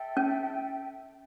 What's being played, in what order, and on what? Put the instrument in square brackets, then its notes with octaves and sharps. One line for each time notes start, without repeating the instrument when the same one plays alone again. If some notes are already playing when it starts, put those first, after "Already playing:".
Already playing: [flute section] A4 E5 G5
[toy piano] C#4